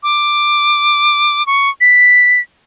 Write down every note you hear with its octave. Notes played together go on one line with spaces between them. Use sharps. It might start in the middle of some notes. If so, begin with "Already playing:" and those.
D6
C#6
B6